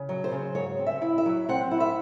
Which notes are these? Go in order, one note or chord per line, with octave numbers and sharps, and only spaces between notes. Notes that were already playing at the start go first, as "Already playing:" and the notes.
Already playing: C#3
F#3
C5
C#3
G#2 C#5
C4
E5
E4
E5
F#3
C4 F#5
E4
E5